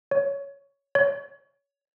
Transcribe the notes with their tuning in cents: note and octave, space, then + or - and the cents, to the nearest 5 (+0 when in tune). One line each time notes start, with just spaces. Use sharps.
C#5 +10
C#5 +20